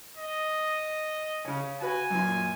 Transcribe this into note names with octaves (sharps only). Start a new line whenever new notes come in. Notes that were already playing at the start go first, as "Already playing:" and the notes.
D#5
C#3 C#4
F#4 B4 G#5
F#2 A#2